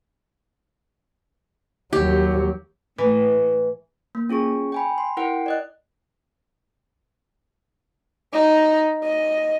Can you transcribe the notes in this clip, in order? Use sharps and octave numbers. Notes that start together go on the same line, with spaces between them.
D#2 F#3 G4
A2 E3
A#3
C#4 F4 G#4 C#6
G5 G#5 B5
C6
E4 A#4 F#5 G5 D7
D5 D#5 F#6
D#4
D#5